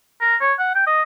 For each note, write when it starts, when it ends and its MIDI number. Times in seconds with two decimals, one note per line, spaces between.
0.21 0.36 70
0.41 0.53 73
0.59 0.72 78
0.75 0.84 79
0.87 1.03 75